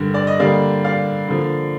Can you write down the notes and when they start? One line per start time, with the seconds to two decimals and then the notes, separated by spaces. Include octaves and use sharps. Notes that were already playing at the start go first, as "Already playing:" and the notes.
Already playing: G2 D3 G3 A#4
0.14 D5
0.27 D#5
0.39 D3 G3 A#3 D5 F5
0.84 D5 F5
1.28 D3 F3 A#3